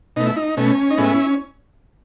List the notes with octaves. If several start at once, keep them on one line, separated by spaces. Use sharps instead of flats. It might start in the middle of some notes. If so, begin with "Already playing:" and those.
B2 A3 D#4
E4
D#4
B2 A3 C#4
D#4
A2 G#3 B3 C#4 E4